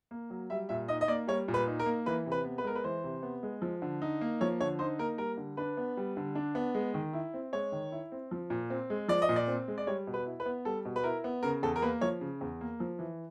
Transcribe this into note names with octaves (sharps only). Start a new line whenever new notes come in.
A#3
F#3
G3 E5
A#2 E5
D#4 D#5
D#5
A#3 D5
G3 C#5
A#2
B4
D#4
A#4
A#3
E3 B4
C3
B4
B3
B4
G#3 A#4
B4
E3 C5
C3
B3
G#3
F3
D3
D#4
A#3
F3 C#5
D3 C#5
D#4 C5
A#3 A#4
G3 A#4
D3
D4 B4
B3
G3
D3
D4
B3
G#3
D#3
E4
C4
G#3 C#5
D#3
E4
C4
F3
A#2
C4
G#3
F3 D5
D#5
A#2
D5
C4
G#3
D5
G3 C#5
B2
B4
E4
B4
B3
G3 A4
B2
B4
E4 A#4
B3
C#3 A#4
E2 A4
A#4
A#3 B4
F3 C#5
C#3
E2
A#3
F3
E3